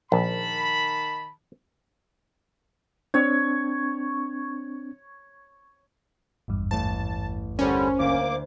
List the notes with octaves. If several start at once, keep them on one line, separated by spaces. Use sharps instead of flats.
A#1 D#3 A5 B5
C4 D4 C#5
G#1 E2 G2
A1 A3 A5
D3 G3 C#4 A#4 C5 G#5
D2 A#3 D6